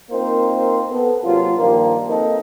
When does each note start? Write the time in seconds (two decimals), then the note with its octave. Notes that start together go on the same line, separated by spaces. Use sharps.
0.10 A#3 C4 D#4 F4 A#4 C5
0.89 B3 A4
1.24 C3 F#3 A#3 F4
1.57 G2 D#3 F3 A#3
2.08 A#3 C4 D#4 A4 B4